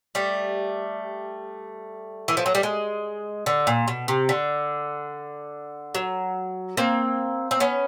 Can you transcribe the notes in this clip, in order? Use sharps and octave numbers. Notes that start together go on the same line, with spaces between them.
G3 A3
E3
F3
F#3
G3
G#3
D3
A#2
B2
C3
D3
F#3
A#3 C4
C4
B3 C#4